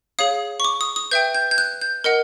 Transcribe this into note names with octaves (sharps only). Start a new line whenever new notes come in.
G#4 C#5 F5 D#6
C#6
D6
D#6
D#6
B4 E5 G5 G6
G6
G6
F#6
G6
A#4 D#5 F#5